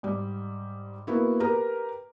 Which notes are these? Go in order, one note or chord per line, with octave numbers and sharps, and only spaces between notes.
G#2 G3
A#3 B3 E4 F#4
G4 A#4 B4 A#5